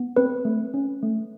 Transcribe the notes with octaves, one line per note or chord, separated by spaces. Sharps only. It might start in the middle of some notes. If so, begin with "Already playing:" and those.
Already playing: B3
C4 B4
A3
C#4
A3